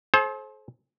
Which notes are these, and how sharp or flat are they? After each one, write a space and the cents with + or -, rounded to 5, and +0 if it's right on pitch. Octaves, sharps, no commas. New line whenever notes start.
A4 -45 C5 +25